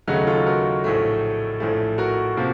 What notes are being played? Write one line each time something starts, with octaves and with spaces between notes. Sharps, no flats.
D#2 C#3 F#3 A3 D#4 F#4
F4 A4
F#4 A#4
A#1 A2 A3
A#1 A2 A3
F#4 A#4
C3 F3 A#3